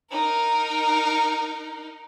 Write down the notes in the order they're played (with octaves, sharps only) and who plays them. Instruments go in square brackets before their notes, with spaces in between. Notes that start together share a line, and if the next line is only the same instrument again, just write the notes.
[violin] D#4 A#4